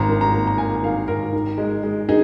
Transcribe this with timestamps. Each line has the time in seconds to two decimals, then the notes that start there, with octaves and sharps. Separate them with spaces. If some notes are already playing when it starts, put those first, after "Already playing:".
Already playing: G#1 A#5
0.09 D#3
0.21 A#5
0.33 A#3
0.47 A#5
0.58 A#3 G#5
0.83 D#3 F5
1.08 G#1 A#4
1.33 D#3
1.58 G#3
1.83 G#3
2.09 D#4 G#4